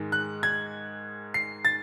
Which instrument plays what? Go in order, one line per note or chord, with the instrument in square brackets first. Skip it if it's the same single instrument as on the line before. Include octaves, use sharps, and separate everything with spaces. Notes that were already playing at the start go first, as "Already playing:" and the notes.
Already playing: [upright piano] G#2 D#3 G#3
F#6
G#6
C7
A6